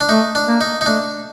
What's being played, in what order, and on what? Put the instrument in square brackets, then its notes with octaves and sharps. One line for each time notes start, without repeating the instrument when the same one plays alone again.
[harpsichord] D4
[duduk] A3 [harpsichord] D#4
[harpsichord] D4
[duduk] A#3
[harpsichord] D#4
D#4
[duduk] A3 [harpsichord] D4